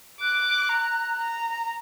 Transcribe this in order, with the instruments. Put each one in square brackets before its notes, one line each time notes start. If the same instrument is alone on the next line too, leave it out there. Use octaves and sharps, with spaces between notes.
[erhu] D6 [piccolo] F#6
[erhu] A#5
A#5